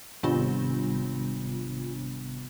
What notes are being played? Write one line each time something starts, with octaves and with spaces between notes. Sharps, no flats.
G#1 C3 G3 B3 D4 F4